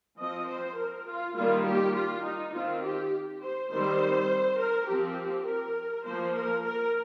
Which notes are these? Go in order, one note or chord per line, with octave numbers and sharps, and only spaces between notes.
F3 C4 D#5
C5
A#4
F4
D#3 G3 A#3 F4
G4
F4
D#4
D#3 C4 F4
G4
C5
D#3 G3 C4 C5
A#4
F3 C4 G4
A#4
F3 A#3 C5
A#4
A#4